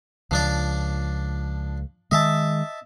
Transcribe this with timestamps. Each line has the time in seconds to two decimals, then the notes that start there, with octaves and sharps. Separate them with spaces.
0.31 C#2 F3 D4 D5
2.11 D#3 G#3 D#5 E5 A5